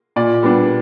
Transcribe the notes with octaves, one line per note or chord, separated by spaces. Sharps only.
A#2 D5
G3 B3 D4